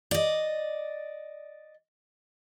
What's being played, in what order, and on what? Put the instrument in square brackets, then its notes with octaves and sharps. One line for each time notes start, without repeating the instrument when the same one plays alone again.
[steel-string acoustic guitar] D5 D#5